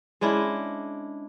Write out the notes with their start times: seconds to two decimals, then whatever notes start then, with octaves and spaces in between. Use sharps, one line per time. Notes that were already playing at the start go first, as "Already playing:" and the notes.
0.21 G#3 C#4 D4 E4